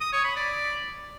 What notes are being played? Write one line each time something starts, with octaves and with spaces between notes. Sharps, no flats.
D#6
C#5
B5
D5